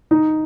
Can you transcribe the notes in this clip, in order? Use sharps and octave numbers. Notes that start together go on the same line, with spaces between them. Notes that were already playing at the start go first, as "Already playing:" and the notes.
D#4